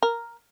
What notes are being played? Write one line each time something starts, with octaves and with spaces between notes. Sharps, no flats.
A#4